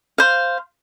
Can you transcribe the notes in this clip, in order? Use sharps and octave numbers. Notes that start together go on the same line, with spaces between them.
C5 F5